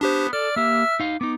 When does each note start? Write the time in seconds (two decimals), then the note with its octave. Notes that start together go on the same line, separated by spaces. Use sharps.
0.01 B3 D4 G4 C5
0.33 A4 D5 F6
0.56 A#3 G4 E5
1.00 D#4 F5
1.21 B3 D#4 D6